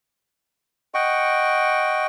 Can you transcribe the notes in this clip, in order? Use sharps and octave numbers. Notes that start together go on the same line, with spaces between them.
D#5 F#5 G5 C#6